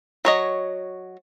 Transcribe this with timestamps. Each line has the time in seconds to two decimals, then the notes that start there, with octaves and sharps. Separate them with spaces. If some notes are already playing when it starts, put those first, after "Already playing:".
0.25 F#3 C#5 D#5